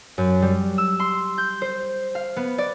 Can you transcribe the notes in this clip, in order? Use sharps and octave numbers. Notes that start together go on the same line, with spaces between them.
F#2
G3
E6
C6
G6
C5
F5
B3
D5